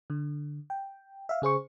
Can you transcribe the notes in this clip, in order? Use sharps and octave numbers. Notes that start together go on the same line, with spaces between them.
D3
G5
E5 F5
C#3 G#4 C5 C#6